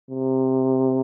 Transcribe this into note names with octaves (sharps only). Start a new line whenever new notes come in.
C3